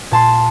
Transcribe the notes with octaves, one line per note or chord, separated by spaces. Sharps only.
A#2 A5 C6